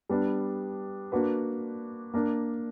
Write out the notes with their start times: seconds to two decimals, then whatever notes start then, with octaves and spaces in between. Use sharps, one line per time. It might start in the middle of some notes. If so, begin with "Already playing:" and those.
0.10 G3 B3 D4
1.12 A#3 D4 F#4 B4
2.14 A#3 D4 A#4